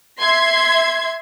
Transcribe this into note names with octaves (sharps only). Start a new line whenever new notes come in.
E5 C6 G#6